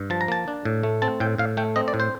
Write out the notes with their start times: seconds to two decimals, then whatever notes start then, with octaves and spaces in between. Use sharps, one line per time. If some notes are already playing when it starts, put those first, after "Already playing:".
Already playing: G2
0.10 F3 A5
0.21 A#5
0.28 A#3 A5
0.48 D4
0.65 A2
0.83 A3
1.02 C4 A5
1.20 A2 G5
1.38 A2 F5
1.57 A3 G5
1.76 C4 D#5
1.88 D5
1.94 A2
2.00 C5